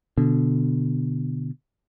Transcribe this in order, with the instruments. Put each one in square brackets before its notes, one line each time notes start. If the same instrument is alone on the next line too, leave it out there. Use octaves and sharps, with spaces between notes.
[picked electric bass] B2 D3